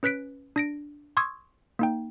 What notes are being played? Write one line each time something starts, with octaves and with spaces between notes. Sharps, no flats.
C#4 B4 F#6 B6 D7
D4 A#6 D7
C6 C#6 D#6 E6 G#6
A#3 D#4 G5